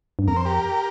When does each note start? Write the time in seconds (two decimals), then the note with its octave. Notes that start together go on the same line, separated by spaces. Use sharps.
0.19 G2
0.28 F2 A#4
0.36 C5
0.45 G4 A#4